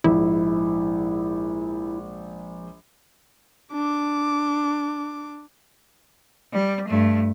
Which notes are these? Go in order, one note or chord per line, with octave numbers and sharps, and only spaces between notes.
A#1 G#2 E4
D4 D6
G3
G2 A3